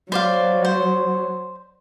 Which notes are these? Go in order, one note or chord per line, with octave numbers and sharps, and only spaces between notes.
F#3 C5 D5 F5
C5